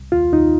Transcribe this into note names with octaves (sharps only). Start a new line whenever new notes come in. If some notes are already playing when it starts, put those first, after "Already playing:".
Already playing: C2
D#2 F4
D#2 D#4